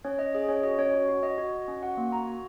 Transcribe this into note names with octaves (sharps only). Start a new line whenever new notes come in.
C#4 C#5
C#4 D#5
G#4 D#5
C#4 C#5
F#4 D#5
C#4 C#5
F#4
F#4
F#4 D#5
F#4
F#4
C#4
F#4 F#5
A#3
F#4 A#5
F#4